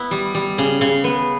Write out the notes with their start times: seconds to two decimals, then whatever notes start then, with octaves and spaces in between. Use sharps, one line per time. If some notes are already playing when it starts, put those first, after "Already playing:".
Already playing: B3 E4
0.11 G3
0.35 G3
0.58 C#3
0.81 C#3
1.04 B3